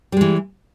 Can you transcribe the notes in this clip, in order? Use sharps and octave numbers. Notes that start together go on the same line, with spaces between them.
E3 G3 G#3